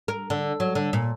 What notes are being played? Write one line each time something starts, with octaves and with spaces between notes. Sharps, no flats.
A#4
D3
F#3
D3
A#2